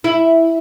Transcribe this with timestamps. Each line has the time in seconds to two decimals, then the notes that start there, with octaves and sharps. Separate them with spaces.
0.04 E4